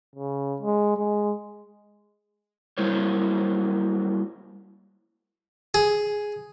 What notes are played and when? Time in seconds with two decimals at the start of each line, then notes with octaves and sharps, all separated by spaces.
0.15 C#3
0.62 G#3
0.97 G#3
2.78 F#3 G3 A#3 E4 C5 C#5
5.74 G#4